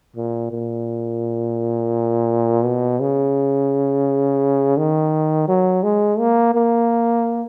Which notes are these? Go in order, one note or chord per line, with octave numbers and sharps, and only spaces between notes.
A#2
A#2
B2
C#3
D#3
F#3
G#3
A#3
A#3